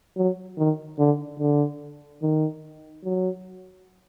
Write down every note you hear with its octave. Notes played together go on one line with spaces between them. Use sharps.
F#3
D#3
D3
D3
D#3
F#3